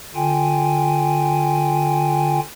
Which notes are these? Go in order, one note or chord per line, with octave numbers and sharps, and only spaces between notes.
D3 F4 G5 G#5